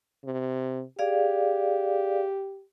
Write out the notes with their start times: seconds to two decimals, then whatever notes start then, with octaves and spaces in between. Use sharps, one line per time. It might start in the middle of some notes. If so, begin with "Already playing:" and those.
0.25 C3
0.99 G4 G#4 D5 F5